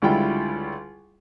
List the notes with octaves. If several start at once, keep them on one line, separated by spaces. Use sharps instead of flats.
C#2 D3 G3 E4 F4 G5